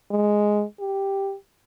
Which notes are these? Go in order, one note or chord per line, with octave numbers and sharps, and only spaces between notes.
G#3
G4